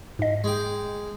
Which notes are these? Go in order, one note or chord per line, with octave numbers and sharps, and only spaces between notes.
G#2 D#5
G#3 G5